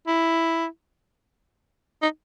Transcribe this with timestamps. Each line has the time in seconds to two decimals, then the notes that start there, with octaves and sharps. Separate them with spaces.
0.07 E4
2.02 D#4